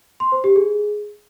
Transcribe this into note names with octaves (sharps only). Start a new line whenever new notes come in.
C6
C5
G4
G#4